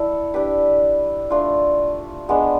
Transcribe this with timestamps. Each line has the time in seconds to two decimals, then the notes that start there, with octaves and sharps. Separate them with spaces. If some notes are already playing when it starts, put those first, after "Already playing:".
Already playing: E4 A4 D5
0.34 D4 G4 B4
1.30 A3 D4 F4
2.29 G#3 B3 D4